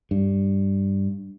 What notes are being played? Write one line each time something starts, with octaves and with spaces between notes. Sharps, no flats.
G2